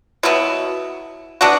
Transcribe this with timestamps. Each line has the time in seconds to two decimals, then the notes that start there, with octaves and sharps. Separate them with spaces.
0.23 B2 F#3 B3 E4
1.41 E3 B3 D4 F#4